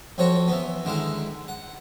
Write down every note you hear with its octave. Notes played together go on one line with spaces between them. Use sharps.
F2 F3 F#4 C#5 A5
E3 B3
D3 D#3 G#3 E4
F#5